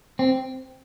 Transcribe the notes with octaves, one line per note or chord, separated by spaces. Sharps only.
C4